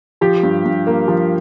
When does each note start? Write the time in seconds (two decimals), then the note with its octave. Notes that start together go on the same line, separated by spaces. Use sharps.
0.21 F3 G4
0.43 G2
0.65 G2
0.87 A#3
1.08 F3